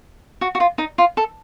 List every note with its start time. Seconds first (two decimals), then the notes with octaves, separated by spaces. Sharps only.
0.41 F#4
0.55 F#4
0.60 F4
0.78 D#4
0.98 F4
1.17 A4